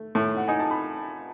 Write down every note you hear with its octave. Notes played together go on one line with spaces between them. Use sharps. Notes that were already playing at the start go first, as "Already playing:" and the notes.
Already playing: A3
A2
F#5
D#4 G#5
A5
B5